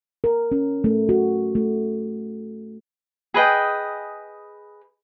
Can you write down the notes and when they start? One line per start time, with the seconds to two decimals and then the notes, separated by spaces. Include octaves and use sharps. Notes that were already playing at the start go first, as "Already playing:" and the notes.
0.24 A#4
0.52 C#4
0.84 A3
1.09 F#4
1.55 A3
3.34 G#4 B4 D#5 G5